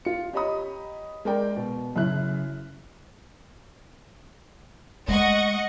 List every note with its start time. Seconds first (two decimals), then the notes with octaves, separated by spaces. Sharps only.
0.05 F4 C#7
0.33 G4 C#5 D#5 A#5 B5 D#6
1.25 G#3 A#4 D5 G5
1.56 B2
1.96 F#2 C#3 E4 F#6
5.08 G#3 A3 D#5 F#5 C#6